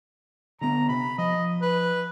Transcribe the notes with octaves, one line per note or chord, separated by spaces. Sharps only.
D3 B3 A#5
C3 B5
F3 D#5
B4